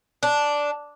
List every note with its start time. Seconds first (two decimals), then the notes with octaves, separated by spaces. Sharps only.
0.23 D4